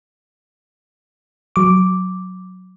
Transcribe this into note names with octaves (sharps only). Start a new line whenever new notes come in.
F#3 D6